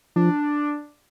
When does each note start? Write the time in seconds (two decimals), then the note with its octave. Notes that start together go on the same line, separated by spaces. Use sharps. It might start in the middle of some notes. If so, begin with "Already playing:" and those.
0.16 F3 D4